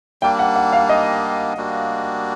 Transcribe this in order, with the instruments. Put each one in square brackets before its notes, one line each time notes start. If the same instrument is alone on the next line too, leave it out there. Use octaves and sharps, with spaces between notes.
[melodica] G3 A#3 D4 [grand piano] G5
[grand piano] F#5
F#5
F5
D#5
[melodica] G3 A#3 D4 F#4